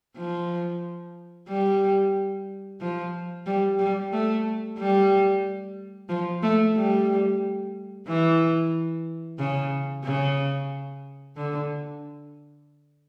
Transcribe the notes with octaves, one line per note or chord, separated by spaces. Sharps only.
F3
G3
F3
G3
G3
A3
G3
F3
A3
G3
E3
C#3
C#3
D3